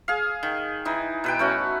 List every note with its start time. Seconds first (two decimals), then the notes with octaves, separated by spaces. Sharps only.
0.08 G#4 F5
0.43 D#3
0.85 E3 D#4
1.24 B2 B4 G5
1.39 A3 C#4 F#4